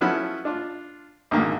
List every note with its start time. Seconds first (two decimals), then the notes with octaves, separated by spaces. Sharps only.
0.01 F3 F#3 A3 B3 C#4 E4
0.45 D4 F4
1.31 B1 F2 G#2 D3 D#3 A#3